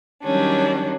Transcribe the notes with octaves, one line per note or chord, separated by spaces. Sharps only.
D#3 F#3 G3 C#4 D4